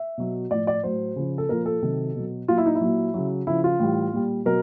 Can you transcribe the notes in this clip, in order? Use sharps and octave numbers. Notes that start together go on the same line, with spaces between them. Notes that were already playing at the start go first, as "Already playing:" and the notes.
Already playing: E5
B2 F#3
A2 F3 D5
D5
A2 F#3 C5
C#3 F3
A4
A#2 F3 A#4
A4
C3 D#3 F#3
B2 F#3
A#2 F#3 F4
E4
D#4
E4
A#2 F#3
C#3 F#3
C#3 F3 E4
F4
A2 E3 G3
A#2 G3
B2 F#3 A#4